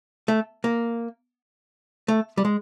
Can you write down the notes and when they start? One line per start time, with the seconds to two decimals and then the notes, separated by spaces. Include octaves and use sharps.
0.28 A3
0.64 A#3
2.08 A3
2.37 G3
2.45 G#3